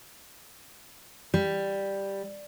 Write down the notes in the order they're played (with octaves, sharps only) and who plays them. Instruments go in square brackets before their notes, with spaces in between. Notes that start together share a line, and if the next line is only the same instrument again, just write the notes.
[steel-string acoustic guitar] G3